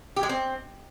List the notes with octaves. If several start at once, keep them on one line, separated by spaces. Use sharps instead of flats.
G4
G#3
C4